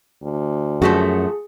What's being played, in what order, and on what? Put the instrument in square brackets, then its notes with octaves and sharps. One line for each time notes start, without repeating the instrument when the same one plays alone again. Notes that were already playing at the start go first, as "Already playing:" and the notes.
[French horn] D2
[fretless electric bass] F#2 [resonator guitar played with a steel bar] F3 A3 F#4 [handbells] G#4